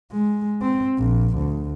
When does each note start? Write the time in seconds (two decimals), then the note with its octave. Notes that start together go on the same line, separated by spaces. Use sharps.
0.12 G#3
0.62 C4
0.98 A#1
1.37 D2